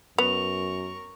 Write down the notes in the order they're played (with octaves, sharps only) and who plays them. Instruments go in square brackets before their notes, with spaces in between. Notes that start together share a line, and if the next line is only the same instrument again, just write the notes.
[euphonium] F#2 [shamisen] B3 [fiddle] A#4 C#6 [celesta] F7